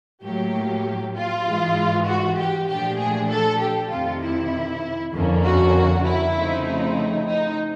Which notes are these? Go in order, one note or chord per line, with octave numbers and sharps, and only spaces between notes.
A2 F#3 A#3 G4
F4
G#2 E3 G#3
F#4
G4
A#2 F3 A3 D4 G4
G#4
A4
G4
F2 C3 D#3 F4
E4
F2 D3 F3 A#3 C#4
F#4
E4
C#3 F3 A3 C4 D#4
E4
D#4